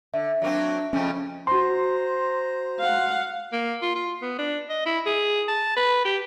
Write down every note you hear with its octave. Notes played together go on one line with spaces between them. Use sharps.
D3 E5
F#3 A#3 C4 D4
F2 C#3 F3 C#4
F#4 C5 A#5 C6
F5 F#5
A#3
F4
F4
B3
D4
D#5
E4
G#4
A5
B4
G4